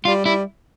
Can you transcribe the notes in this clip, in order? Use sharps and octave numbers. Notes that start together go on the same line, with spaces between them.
G3 F4
G3 E4